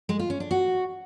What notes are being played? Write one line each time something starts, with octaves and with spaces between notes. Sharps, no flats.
G#3
F4
C#4
D4
F#4